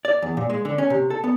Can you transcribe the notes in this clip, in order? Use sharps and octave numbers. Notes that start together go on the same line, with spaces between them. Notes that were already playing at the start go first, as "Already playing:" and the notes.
D5
E2
A#2
G#3
D3
C#4
C3
A4
B3